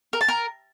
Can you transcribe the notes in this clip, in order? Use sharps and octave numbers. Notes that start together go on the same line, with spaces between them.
A#4
A5
A#4